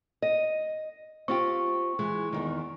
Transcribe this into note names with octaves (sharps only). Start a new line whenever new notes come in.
D#5
C4 F4 G4 C#6
E3 G#3
E2 G#2 D#3